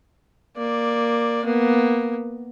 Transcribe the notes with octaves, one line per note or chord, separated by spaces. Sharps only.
A#3 D5
A#3 B3